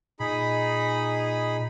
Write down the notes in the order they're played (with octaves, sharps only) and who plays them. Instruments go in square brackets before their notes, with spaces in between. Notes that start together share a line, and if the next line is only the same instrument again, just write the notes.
[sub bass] A#2 [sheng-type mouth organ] D#4 G#4 B5